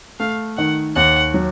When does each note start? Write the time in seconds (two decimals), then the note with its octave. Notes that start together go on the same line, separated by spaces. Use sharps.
0.20 A3 F5
0.57 D#3 F#5
0.96 D#2 F#5
1.34 F#3